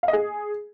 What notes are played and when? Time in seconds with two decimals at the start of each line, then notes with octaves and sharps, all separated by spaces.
0.03 F5
0.08 D#5
0.13 G#4